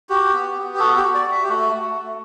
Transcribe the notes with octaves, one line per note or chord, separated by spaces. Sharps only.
F#4 G4
B3
B3
G4
F#4 A4
G4
F#4
D5
F#4
E5
G4
A3 F#4
A3
A3